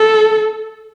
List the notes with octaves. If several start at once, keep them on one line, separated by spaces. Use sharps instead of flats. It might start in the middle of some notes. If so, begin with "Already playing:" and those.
Already playing: A4